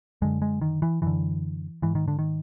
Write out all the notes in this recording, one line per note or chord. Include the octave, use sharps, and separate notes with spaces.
F#2 D3 G#3
G#3
D#3
E3
F#2 D3 E3
G#2 E3
D#3
D3
D#3